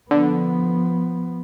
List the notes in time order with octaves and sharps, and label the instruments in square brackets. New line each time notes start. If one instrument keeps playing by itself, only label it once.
[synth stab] D3 [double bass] F3 B3